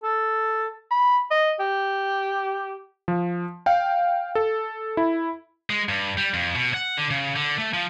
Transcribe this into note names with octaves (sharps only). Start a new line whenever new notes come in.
A4
B5
D#5
G4
F3
F5 G5
A4
E4
G#3
G2
G3
F2
B2
F#5
D3
C#3
D3
A3
F3